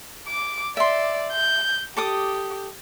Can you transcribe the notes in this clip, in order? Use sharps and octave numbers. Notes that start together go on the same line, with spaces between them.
D6
D5 E5 C6
G6
G4 A4 D6 D#6